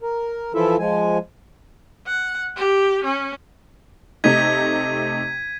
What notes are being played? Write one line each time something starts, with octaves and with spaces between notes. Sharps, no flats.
A#4
E3 F3 E4 F4 A4 E5
F3 G#3 G#5
F#5
G4
C#4
C3 A3 D#4 G#6 B6 D#7